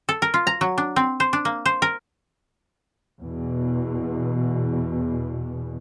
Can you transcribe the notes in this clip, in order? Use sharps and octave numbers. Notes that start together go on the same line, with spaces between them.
A4
A#4
F4
A#5
F#3
D4
C4
C5
D4
A#3
C5
A#4
E2 B2